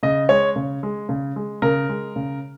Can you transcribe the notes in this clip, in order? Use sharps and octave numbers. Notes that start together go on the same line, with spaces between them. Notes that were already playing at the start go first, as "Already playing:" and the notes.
C#3 D#5
G#3 C#5
C#3
G#3
C#3
G#3
C#3 A#4
G#3
C#3